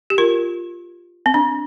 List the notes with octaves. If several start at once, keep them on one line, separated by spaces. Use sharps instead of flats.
G4
F4 A#4
C4
D4